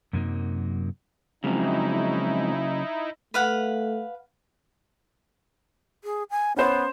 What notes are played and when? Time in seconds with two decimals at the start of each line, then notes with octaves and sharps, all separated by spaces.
0.13 F#2 C3 F#3 A#3 D#4
1.44 C#3 F3 F#3 G#3 C4 D#4 E4
3.34 A3 B4 F5 F#5
6.04 G#4
6.30 G#5
6.56 B3 C#4 C5 C#5